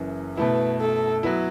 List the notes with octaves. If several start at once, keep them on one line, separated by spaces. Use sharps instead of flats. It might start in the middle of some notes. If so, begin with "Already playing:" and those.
Already playing: F#1 F#2 E3
B2 A3 E4 B4
A4
F#3 B3 E4